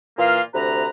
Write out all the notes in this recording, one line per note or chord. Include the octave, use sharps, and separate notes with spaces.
A#2 E3 A#3 F4 F5
D2 C3 B4 A#5